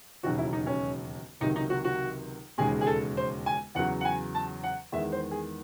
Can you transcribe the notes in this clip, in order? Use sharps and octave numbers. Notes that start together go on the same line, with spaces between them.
E1 D#2 C#3 F#3 F#4
E4
D#4
C#4
C#2 C3 D#3 F#3 D#4
D#4
F#4
F#4
E1 D#2 C#3 G#3 G#4
G#4
A4
C5
G#5
E2 C#3 F#3 F#5
F#5
G#5
A5
F#5
E2 D#3 G#3 E5
C5
G#4